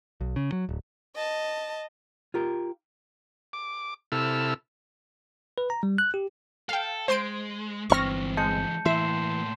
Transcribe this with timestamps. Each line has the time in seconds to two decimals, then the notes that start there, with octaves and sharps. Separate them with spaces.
0.21 B1
0.36 C#3
0.52 F#3
0.69 D1
1.16 D#5 A5
2.34 F4 G4 A#4
3.53 D6
4.12 C3 E4 A4 E6 F6
5.58 B4
5.70 A#5
5.83 G3
5.98 F#6
6.14 G4
6.69 A4 F5 G5
7.08 G#3 C5 C6 D7
7.90 G1 C#2 D3 E3 C4 C#6 F6 A#6
8.37 G#3 A5 G6 C#7
8.86 A2 E3 A#3 E5 C6 C7 E7